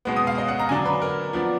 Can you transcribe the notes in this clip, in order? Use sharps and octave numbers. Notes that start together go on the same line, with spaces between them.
B2 G#3 B3
D#6
F5
D#5
F#5
A#5
D3 F#3 D4 G#5
B4
A#4
F3 B3 D4